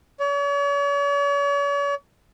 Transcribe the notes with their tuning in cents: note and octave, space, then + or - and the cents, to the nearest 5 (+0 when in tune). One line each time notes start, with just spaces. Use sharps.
C#5 +40